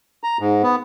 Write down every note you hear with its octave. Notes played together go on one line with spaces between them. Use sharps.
A#5
G#2
B3